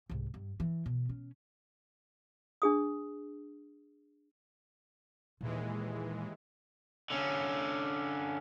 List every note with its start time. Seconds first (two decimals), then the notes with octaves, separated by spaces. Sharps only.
0.10 C2 G#2
0.34 G2
0.60 E3
0.86 B2
1.09 C#4
2.62 D4 G#4 D#6
5.41 D#2 A#2 E3 G#3
7.10 D3 C#4